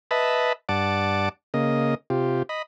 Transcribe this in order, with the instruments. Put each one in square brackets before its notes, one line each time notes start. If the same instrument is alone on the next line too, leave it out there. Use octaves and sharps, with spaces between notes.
[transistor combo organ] B4 D#5 E5 A5 B5
G2 D5 F#5 A5 D6
C#3 A#3 D#5
C3 F4 G4
D#5 B5